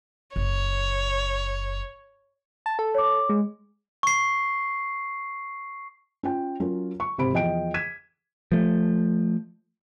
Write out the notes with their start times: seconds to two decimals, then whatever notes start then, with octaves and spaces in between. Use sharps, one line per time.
0.36 F#1 C#5
2.66 A5
2.79 A4
2.95 C#5 D6
3.29 G#3
4.03 C#6 C7
6.23 C#4 F4 G5
6.60 F#3 C#4 F4 A#4
7.00 C#6
7.18 G#1 C3 G4 C5 B5 D7
7.33 E2 F3 D#5 G5 D7
7.74 G#6 B6 D#7 E7
8.52 F3 A3